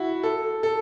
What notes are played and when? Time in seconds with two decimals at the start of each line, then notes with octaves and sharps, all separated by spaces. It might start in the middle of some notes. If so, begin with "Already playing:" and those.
Already playing: E4 F#4
0.23 A4
0.63 A4